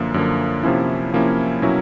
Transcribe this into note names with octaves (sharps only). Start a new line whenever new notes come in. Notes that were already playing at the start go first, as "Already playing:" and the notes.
Already playing: F#2 D3 F3 A#3
F#2 D3 F3 A#3
C3 F3 A#3 C#4 E4
C3 F3 A#3 C#4 E4
B2 F#3 A#3 C#4 E4